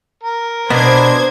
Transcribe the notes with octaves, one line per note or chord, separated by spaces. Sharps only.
A#4
B2 B3 D4 C5 G#6